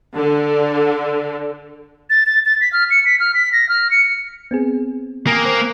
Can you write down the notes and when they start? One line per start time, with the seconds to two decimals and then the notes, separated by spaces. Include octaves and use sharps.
0.16 D3
2.10 A6
2.26 A6
2.46 A6
2.61 B6
2.73 F6
2.91 C#7
3.05 B6
3.20 F6
3.35 B6
3.53 A#6
3.69 F6
3.91 C#7
4.51 B3 C4 G#4
5.27 A#3 G5 G#5 D#6
5.42 C5 F#6